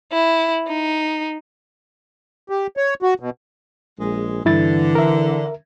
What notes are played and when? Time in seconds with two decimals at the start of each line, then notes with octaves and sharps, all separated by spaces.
0.12 E4
0.68 D#4
2.49 G4
2.77 C#5
3.02 F#4
3.20 B2
3.99 A#1 G#3
4.45 G2 D3 E3 E4 A6
4.95 A#4 E5